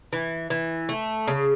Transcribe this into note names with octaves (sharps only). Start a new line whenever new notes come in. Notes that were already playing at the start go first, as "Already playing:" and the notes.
E3
E3
A3
C#3